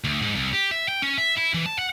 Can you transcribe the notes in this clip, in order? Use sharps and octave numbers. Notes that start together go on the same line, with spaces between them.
D2
G#2
C2
G4
E5
G5
C#4
E5
E4
E3
A5
F#5